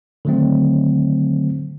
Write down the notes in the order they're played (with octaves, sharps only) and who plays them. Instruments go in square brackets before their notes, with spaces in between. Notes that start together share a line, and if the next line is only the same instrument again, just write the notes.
[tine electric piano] D3 D#3 F#3 A3 C4